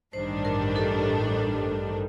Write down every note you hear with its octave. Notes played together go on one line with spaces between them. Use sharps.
A1 G2 D#3 G3 D4 C5
A#4
A4